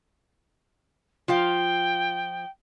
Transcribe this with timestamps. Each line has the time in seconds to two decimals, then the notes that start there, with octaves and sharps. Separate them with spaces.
1.28 F3 F4 F5 G5